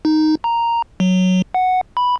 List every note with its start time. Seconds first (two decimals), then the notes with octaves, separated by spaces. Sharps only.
0.05 D#4
0.44 A#5
1.00 F#3
1.54 F#5
1.97 B5